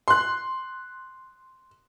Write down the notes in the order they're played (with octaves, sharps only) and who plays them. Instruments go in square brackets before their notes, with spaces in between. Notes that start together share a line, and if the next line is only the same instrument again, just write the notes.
[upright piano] C6 F#6